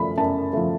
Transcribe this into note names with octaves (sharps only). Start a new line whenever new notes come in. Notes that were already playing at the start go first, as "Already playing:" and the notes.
Already playing: F#2 F3 A3 B5
F#2 A5
F3 A3